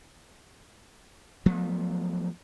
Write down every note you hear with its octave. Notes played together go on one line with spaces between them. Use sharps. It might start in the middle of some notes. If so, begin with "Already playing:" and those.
F3 F#3 A3 B3